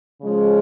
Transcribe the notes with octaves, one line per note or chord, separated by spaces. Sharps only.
C#3 F3 G#3 C#4